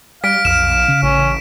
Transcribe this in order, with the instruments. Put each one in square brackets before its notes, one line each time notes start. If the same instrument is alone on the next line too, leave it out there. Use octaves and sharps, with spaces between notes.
[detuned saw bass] G3 [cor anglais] F5 [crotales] B6 D7
[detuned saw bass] B1 [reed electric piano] F2 F6 [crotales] E7
[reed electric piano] C#3
[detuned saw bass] A1 [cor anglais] C#4